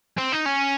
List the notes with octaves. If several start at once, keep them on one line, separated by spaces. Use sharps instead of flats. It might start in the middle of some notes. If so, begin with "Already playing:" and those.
C4
D#4
C#4